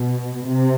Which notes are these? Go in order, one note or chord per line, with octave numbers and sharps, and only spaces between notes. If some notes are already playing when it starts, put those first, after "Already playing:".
Already playing: B2
C3